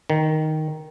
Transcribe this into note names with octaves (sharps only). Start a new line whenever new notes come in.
D#3